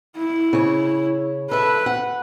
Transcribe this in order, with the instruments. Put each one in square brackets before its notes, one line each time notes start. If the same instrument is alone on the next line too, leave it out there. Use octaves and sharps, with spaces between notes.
[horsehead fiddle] E4
[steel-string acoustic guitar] C#3 C#5
[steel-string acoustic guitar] A4 E5 [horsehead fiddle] B4
[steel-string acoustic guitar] F#5